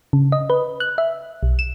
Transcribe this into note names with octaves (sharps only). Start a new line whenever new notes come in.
C#3
D#5
B4
F#6
E5
B1
E7